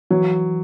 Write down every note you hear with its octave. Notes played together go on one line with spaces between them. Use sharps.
E3 F#3